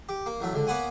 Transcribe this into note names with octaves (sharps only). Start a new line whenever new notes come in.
G4
A#3
A1 F#3 A3
C#2 D3
A#3 B3 B4 C#5 F#5 G#5